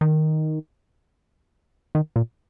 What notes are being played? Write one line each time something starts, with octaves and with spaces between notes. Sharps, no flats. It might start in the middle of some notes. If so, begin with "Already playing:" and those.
D#3
D#3
A#2